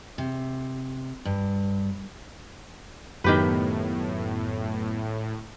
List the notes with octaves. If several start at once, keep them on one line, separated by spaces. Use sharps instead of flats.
C3
G2
F#2 A2 D#3 B3 G4 B4